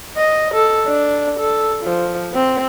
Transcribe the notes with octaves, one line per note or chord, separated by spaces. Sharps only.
D#5
A4
D4
A4
F3
C4